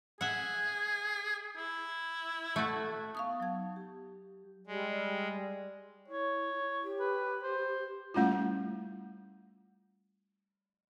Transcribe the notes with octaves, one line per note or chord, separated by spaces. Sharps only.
G#4 E5 F#5
E4
A3 F#4
B3 D#4 F5 A5 C#6 D#6
F#3 G#6
G4
G3 G#3
E4 C#5
G4
B4
C5
G3 A3 C#4 E4 F4